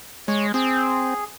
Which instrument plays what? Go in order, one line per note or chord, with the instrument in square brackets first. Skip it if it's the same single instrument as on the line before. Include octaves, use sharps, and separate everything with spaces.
[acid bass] G#3 [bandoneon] C#5
[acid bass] C4 [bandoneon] G#4